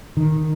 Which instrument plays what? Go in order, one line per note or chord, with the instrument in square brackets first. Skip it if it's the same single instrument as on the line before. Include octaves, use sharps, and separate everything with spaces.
[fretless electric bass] D#3